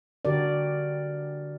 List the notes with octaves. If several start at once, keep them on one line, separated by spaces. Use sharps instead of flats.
D3 F#4 G4 A#4 D5